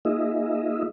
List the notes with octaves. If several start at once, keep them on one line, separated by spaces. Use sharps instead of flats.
A#3 D#4 F4 G#4 D#5 E5